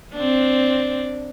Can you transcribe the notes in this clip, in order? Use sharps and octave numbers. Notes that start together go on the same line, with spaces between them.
C4 D4